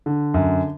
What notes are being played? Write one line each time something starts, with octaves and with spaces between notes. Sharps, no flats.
D3
F#2